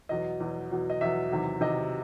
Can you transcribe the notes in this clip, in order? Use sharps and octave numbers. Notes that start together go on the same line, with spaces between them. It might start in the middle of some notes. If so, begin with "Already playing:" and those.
E2 B2 F#3 D#5
E2 B2 F#3
E2 B2 F#3
D#5
E2 B2 F#3 E5
E2 C3 D#3 F#3
E2 C3 D#3 F#3 D#5